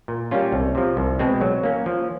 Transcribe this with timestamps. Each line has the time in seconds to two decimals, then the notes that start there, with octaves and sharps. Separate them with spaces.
0.08 A#2
0.31 G3 A#3 C#4 F4
0.52 C2
0.75 C3 F3
0.97 C2
1.19 B2 G#3 C4
1.41 F#3
1.64 A#3 C#4
1.86 F3